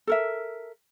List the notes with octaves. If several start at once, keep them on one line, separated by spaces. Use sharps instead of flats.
A4 A#4 E5